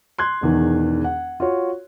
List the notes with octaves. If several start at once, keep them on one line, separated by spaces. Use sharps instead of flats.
C6 F#6 G#6
E1 E2 D#3
F#5
F4 F#4 C#5